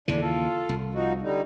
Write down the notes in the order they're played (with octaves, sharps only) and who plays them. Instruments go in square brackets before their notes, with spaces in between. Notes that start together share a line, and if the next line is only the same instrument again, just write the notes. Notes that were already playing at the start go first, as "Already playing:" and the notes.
[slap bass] D#2 C#3 E3 [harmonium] A2 D4
[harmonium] F4 A4
[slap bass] C2
[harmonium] F3 D#4 F#4
D3 G3 D#4